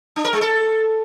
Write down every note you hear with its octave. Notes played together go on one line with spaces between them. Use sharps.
D4
A#4
G#3
A4